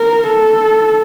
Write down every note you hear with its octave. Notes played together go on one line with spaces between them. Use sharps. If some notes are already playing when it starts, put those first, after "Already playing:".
Already playing: A#4
A4